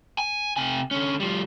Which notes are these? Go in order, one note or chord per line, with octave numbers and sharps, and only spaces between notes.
G#5
C3 G#5
D3 C#4
F3 G3